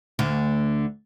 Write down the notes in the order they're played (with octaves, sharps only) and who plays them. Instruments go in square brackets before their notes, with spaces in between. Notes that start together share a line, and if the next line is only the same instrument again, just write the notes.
[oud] D2 D3